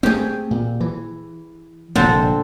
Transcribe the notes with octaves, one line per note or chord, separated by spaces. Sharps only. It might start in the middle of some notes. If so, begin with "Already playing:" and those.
A3 C4 G4 G#4
A#2
E3
F1 A#2 D3 A#3 C4